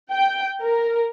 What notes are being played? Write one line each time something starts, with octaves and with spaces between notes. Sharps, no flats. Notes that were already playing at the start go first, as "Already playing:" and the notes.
G5
A#4